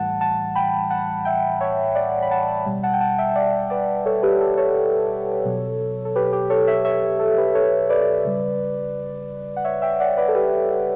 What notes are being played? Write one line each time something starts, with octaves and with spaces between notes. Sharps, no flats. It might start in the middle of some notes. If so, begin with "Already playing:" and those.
Already playing: A2 E3 G3 F#5 A5
F#5 A5
G5 B5
F#5 A5
E5 G5
C#5 E5
D5 F#5
B5
F#5 A5
B2 G3
F#5 A5
G5
F#5 A5
E5 G5
D5 F#5
B4 D5
A4 C#5
G4 B4
A4
A4 C#5
B2 F#3
A4
G4 B4
G4 B4
A4 C#5
C#5 E5
C#5 E5
A4
G4 B4
A4 C#5
B4 D5
C#3 G3
F#5
C#5 E5
E5 G5
D5 F#5
B4 D5
A4
G4 B4